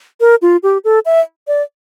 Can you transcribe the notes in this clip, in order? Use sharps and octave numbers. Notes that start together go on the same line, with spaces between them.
A#4
F4
G4
A4
E5
D5